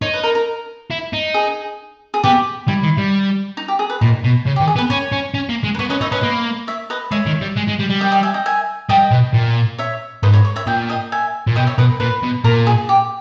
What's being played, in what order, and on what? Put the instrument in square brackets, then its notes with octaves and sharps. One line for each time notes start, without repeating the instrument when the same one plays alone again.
[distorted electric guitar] D#4 [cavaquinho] C#5
[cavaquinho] B4
A#4
A#4
[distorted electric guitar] E4
D#4
[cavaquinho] G#4
G#4
[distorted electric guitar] B3 [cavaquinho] G4
[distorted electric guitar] G3 [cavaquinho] E4
[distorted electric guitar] D#3
G3
[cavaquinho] D#4
G4
G#4
B4
[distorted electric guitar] A#2 [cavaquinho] D#4
[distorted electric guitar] B2
C#3
[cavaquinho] G4
[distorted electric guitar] D#3
[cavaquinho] G#4
[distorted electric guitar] B3
[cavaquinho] B4
[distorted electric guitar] C#4 [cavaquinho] C#5
[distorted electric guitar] C#4
C#4
A#3
G#3
[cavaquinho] B4
[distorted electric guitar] B3 [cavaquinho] C#5
[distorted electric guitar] C#4 [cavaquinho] B4 D#5
[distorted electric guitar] D#4 [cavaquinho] C#5 E5
[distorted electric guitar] C#4 [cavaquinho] B4 D#5
[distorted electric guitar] A#3
[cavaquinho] C#5 E5
B4 D#5
[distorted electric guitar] G#3 [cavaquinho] C#5 E5
[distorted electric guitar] D#3
G3
G#3
G#3
G3
G3
[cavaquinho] D#5 G5
D#5 G5
E5 G#5
D#5 G5
E5 G#5
[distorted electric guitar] G3 [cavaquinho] D#5 G5
[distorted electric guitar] B2
A#2
[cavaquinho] C#5 E5
[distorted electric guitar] G#2 [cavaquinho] B4 D#5
[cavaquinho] C#5
C#5
C#5 E5
[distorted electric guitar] A#2 [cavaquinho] D#5 G5
[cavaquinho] D#5 G5
E5 G#5
[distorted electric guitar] A#2
[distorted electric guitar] B2 [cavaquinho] D#5 G5
[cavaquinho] C#5 E5
[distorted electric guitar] B2 [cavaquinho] B4 D#5
[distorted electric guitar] A#2 [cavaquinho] B4
[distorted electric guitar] B2
[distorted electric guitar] A#2 [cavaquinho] A#4
[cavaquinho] G#4
G4